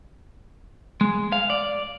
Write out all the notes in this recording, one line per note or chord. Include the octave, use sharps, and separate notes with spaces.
G#3
F5
D5